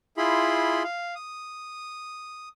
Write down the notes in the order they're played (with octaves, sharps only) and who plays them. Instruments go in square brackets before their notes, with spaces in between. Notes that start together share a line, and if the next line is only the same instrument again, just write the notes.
[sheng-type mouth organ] E4 F4 G#4 B5 C6
F5
D#6